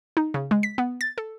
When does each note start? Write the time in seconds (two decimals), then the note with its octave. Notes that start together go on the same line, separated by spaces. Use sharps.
0.17 D#4
0.34 C#3
0.51 G#3
0.63 B6
0.78 B3
1.01 A6
1.18 A4